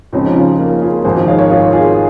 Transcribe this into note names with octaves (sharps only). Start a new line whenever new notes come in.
C#2 C#3 F3 C4 D#4
C#4 F4
A#3
F4 G#4
G#1 G#2 F3 G#4 C5
C#5 F5
A#4 C#5
F4 G#4
F4 G#4